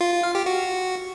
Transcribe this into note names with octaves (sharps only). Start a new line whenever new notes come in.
F4
F4
F5
G4
F#4